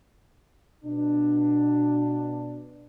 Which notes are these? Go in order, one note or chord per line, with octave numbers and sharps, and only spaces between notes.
B2 D4